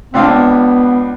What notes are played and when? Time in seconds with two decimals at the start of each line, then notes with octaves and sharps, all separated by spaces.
0.14 C#2 C4 D4 F5
0.28 B3